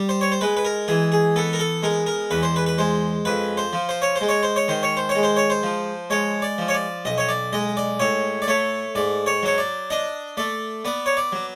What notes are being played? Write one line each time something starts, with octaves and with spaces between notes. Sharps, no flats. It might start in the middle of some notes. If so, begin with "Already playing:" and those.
Already playing: G3
C5
C#5
C5
G#3 B4
B4
A#4
E3 G#4
G#4
B3 A4
A#4
A4
G#3 A#4
A#4
E2 B4
C5
B4
B4
G#3 C5
F2 B4
C5
F3
C5
C#5
C5
G#3
C#5
C5
C#5
D#3 C5
C#5
C5
C#5
G#3
C5
C#5
C5
F3
G#3 C#5
D5
F3
C#5
D5
B1 D#5
C#5
D5
G#3 D#5
D5
A2 C#5
D5
A3 C#5
G#2 D5
C#5
F#3 C#5
D5
D4 D#5
A3 D5
B3 D5
C#5
D5
F#3